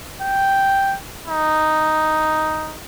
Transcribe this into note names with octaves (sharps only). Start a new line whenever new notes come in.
G5
D#4